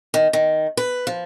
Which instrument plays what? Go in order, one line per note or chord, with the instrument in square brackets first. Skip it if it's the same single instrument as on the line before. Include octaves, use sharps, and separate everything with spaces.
[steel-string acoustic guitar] D#3
D#3
B4
F3